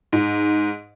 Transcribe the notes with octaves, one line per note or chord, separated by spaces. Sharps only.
G#2